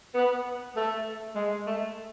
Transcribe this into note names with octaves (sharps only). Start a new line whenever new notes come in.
B3
A3
G#3
A3